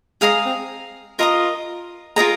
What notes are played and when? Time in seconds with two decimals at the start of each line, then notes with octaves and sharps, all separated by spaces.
0.21 G#3 G#4 F5 A#5 D#6
0.46 C4
1.19 F4 A#4 D#5 A#5 D#6
2.16 F4 G#4 A#4 D#5 A#5